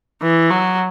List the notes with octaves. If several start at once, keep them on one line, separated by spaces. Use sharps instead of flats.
E3
F#3